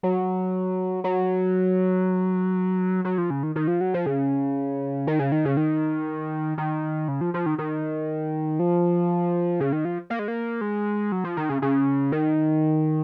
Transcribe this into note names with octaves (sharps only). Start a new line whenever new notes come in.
F#3
F#3
F#3
F3
C#3
D#3
D#3
F3
F#3
F3
C#3
D#3
C#3
D#3
C#3
D#3
D#3
C#3
F3
F3
D#3
D#3
F3
C#3
D#3
F3
A#3
G#3
A#3
G#3
F#3
F3
D#3
C#3
C#3
D#3